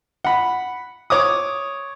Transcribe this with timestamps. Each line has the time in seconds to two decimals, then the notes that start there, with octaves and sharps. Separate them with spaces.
0.25 F#5 B5
1.10 C#5 D6 D#6